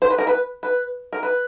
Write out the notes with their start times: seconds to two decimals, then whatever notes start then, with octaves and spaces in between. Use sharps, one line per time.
0.02 C5
0.10 B4
0.18 A#4
0.27 B4
0.63 B4
1.13 A#4
1.23 B4